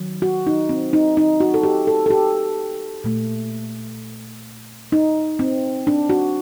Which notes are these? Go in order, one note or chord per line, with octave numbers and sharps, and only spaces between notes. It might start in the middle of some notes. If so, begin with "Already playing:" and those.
Already playing: D#3 F#3
F#4
D#4
C4
D#4
D#4
F#4
A4
G4
A4
A4
G4
A#2 A3
D#4
C4
D4
F#4